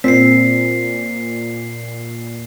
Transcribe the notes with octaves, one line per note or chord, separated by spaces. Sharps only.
A#2 C4 B6 C7